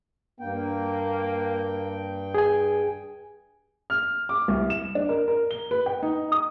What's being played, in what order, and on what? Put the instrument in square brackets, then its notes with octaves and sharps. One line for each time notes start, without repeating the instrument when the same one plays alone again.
[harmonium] G2 G5 [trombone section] A#3
[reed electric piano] G#4 G#5
[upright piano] F6
D6
C2
E7
D4
A#4
A#4
G7
B4
G5
D#4
D#6